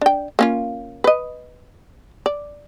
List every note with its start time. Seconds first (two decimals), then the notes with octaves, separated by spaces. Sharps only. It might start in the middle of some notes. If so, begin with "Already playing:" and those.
0.01 D4 G5
0.39 A#3 C#4 F4
1.04 B4 D#5
2.26 D5